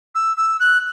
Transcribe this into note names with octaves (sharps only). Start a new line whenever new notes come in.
E6
E6
F#6